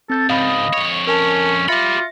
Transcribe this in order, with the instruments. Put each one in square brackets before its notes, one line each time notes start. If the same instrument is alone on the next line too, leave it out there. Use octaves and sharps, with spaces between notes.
[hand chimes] C4 G6 A6 [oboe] A4
[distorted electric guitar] C#2 G#2 [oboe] D#5 [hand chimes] F5 B5 D#6
[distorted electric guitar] F2 C#5
[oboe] C#4 [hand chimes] A#4 G#5 A5
[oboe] F4 [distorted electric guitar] G4 B5 [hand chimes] E5 A#6 C#7